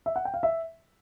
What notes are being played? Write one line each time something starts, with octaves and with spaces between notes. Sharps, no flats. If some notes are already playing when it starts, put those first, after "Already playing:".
E5
F#5
G5
F5
E5